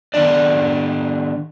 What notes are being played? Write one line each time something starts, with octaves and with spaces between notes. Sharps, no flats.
D#3 B3 D4 D5